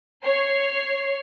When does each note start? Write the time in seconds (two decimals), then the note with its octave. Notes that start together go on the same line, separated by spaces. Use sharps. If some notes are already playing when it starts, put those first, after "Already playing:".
0.24 C#5 C7